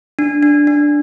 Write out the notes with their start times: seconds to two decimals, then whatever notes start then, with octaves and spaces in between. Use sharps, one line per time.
0.19 D4
0.43 D4
0.67 D4